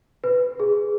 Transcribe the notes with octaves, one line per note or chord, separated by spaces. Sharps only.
B4
G#4